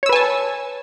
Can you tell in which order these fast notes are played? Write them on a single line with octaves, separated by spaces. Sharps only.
C#5 E6 B4 G#5 A5